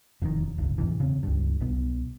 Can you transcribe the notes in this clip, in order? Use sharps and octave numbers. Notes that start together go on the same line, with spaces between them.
E1 F2 A#2 D#3
D1 G1 C#2
E2 G#2 C3 E3
C#3 C4
C#2 G2
C2 B2 B3